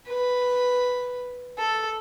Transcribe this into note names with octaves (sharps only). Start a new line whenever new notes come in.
B4
A4